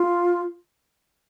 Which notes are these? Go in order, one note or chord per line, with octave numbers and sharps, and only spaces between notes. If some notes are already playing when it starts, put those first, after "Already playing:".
Already playing: F4